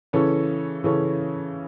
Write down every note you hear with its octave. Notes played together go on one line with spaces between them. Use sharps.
C#3 E3 C#4 A4
C#3 E3 C#4 A4